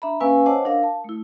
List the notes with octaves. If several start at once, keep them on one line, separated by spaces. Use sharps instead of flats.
D4 E5 A#5 B5
A#3 C#4 B4 F5 G#5 E6
C5 C#5 D#5 F#5 A5 D6
D4 A#4 F5
A5
A3 E4